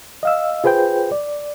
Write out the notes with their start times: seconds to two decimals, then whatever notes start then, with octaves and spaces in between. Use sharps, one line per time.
0.23 D#5 F5 E6
0.64 F4 G#4 B4 C5 G5
1.12 D5